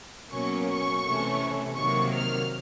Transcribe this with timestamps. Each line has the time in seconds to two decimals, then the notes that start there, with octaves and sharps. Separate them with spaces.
0.32 B2 F#3 A#3 C#4 C#6
0.69 C#6
1.05 C3 E3 A3 C#4
1.77 C3 D#3 F#3 A#3 C#6
2.14 F6